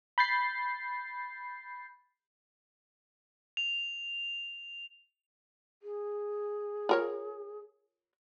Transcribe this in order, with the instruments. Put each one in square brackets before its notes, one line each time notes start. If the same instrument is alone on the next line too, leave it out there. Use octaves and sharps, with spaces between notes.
[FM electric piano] B5 G6 A6 C7
[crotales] F7
[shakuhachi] G#4
[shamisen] F4 A#4 C#5